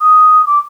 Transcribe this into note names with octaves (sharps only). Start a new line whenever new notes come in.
D#6
D6